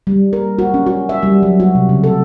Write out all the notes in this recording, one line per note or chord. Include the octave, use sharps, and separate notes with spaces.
G3
A#4
F#4
C#4
F#4
E5
G3
F#3
F#4
C3
C#3
A4